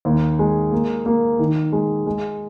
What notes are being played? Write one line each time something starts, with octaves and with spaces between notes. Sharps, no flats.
D#2
G#3
A#3
A#3
D#3
G#3
G#3